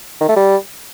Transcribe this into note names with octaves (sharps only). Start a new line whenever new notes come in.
D#3
A3
G3